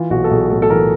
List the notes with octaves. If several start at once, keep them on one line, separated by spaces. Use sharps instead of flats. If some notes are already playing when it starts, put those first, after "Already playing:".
Already playing: E3 F4
B1 F#4
A4
B1 G#4
A2 A4
A4
E3 A#4